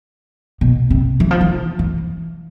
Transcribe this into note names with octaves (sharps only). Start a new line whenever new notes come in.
B2
C3
E3
F3
E3
E3